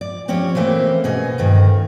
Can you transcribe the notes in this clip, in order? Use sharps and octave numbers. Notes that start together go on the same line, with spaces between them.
D5
F3 C4 C#4 G4 C#5
E3 A3 A#3 C4
B2 C#4 G#4 D#5
D2 G2 D#3